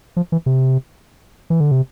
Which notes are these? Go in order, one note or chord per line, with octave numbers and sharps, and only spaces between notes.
F3
E3
C3
E3
D3
C3